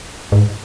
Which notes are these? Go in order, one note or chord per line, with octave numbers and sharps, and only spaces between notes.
G#2